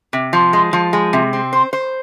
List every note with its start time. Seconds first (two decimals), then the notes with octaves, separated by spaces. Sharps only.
0.13 C3
0.33 F3
0.53 G#3
0.73 F3
0.93 G#3
1.13 C3
1.33 C4
1.53 C5
1.73 C5